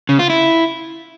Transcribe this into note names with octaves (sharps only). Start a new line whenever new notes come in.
C#3
F4
E4